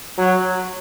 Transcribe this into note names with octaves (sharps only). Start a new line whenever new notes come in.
F#3